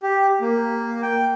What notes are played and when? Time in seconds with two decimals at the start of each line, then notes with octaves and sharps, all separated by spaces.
0.03 G4
0.41 A#3
1.03 G5